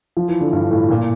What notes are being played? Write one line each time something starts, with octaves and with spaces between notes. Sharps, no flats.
F3
E3
D3
G2
A2
A#2